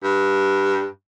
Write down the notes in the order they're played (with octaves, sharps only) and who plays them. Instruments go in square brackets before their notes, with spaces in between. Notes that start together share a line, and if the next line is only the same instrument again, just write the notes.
[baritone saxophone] G2